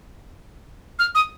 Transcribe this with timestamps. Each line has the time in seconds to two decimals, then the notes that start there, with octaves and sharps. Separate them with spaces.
0.99 F6
1.15 D#6